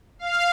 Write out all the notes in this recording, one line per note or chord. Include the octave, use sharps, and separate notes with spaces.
F5